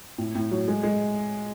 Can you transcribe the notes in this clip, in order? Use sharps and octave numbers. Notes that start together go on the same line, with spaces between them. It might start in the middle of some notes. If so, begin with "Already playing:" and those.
A2
A2
F#3
G#3
G#3